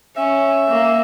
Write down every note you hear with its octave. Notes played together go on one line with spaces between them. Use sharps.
C#4 E5
A#3